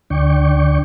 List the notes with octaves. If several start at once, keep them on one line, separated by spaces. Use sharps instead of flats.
D2 D3 D5 G5 C#6